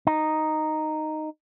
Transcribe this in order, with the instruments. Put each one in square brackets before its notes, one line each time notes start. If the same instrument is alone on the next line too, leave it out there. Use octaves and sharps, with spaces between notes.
[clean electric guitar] D#4